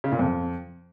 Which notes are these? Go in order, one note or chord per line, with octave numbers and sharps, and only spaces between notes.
C#3
A#2
F2